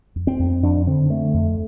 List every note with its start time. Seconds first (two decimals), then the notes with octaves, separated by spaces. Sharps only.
0.16 F2
0.27 C4
0.39 F2
0.63 F2 D4
0.87 D3 C4
1.10 D3 A3
1.34 F2